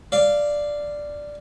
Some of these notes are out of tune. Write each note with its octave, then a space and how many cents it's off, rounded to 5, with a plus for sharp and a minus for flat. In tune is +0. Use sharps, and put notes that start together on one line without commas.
D5 +0 F5 -15